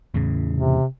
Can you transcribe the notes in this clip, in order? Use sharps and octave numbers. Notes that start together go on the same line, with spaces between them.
E2 A2 C#3
C3